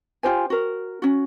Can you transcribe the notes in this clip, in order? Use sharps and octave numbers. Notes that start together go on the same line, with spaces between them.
F4 G4 C5 G#5
F#4 A#4
C#4 F#4